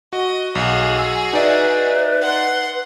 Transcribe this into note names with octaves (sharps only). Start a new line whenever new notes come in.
F#4 D#5
B1 F#4 G#4
E6
D#4 B4 D5 E5
F#5 C6